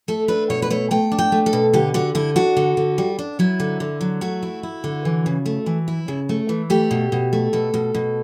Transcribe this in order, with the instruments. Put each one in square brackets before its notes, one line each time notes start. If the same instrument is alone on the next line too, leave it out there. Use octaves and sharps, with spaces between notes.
[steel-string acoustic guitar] A3 A4
D4 B4
B2 C#5
B4
A3 C#5
A3 G5
D4
G5
A3
A4
B2
D3 G4
D3 F#4
D3 E4
D4 F#4
D3
D3
G3
D4
F#3 E4
D3
D3
F#3
A3 F#4
E4
E4
D3
E3
C#3
A3
E3
E4
C#3
A3
E3
A3 G4
B2
B2
A3
B2 A4
B2
B2